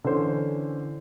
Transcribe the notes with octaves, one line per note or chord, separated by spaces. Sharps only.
D3 E3 C#4 C5